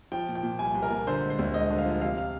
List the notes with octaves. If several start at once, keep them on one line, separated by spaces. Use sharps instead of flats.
F3 G5
A#2
G5
A#2
C2 G#5
C2
A#4
A#2
D3 C5
G#3
C5
D2
G#3 D#5
D3
F5
F3
C3 F5
F5